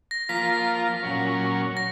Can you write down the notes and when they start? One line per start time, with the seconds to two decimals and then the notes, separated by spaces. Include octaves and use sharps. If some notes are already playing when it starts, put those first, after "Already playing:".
0.11 A#6
0.29 F3 A#3 F4 B6
1.03 A#2 F#3 C#4
1.77 A#6